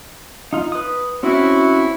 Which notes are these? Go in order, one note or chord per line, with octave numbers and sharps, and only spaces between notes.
D#4 F4
B4 D#6
C4 C#4 E4 F#4